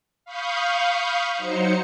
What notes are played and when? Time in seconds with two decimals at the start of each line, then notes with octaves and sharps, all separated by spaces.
0.25 F5 B5 C#6 D#6 G6
1.35 F#3 D#4 C5 C#7